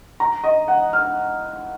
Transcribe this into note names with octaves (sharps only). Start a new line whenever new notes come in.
A#5
D#5
F#5
F6